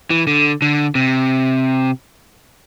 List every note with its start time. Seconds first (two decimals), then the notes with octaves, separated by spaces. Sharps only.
0.10 E3
0.27 D3
0.62 D3
0.95 C3